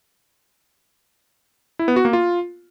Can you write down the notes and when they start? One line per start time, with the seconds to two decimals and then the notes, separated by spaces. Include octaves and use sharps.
1.79 E4
1.88 B3
1.96 F#4
2.05 A#3
2.13 F4